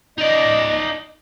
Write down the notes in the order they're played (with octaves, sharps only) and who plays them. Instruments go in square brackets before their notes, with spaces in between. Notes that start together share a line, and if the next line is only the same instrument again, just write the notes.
[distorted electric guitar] D#4 D5 [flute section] D#5